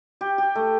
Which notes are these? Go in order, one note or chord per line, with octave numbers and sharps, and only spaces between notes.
G4
G4
A3